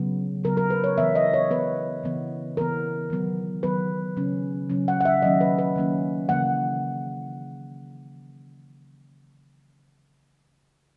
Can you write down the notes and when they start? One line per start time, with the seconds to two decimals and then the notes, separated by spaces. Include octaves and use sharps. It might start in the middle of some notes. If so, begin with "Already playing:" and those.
Already playing: C#3 F#3 B3
0.44 C#3 F#3 B3 A#4
0.57 A#4
0.70 B4
0.84 C#5
0.98 E3 B3 E5
1.15 D#5
1.34 C#5
1.50 E3 B3 B4
2.04 C#3 E3 B3
2.57 C#3 E3 B3 A#4
3.10 D#3 F#3 B3
3.63 D#3 F#3 B3 B4
4.17 C#3 F#3 C#4
4.70 C#3 F#3 C#4
4.88 F#5
5.01 F#5
5.05 E5
5.22 D#3 F#3 A#3 C#4 D#5
5.41 B4
5.59 B4
5.76 D#3 F#3 A#3 C#4
6.29 C#3 E3 A#3 F#5